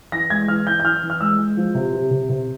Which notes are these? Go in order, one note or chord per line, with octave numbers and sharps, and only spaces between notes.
E3 A#6
G#3 G#6
E3 F6
E3 G6
G6
E3 F6
E3
F6
G#3 E6
G#3
F3
C3
C3
C3
C3